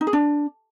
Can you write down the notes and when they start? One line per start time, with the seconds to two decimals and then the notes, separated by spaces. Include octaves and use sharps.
0.01 D#4
0.07 G#4
0.13 D4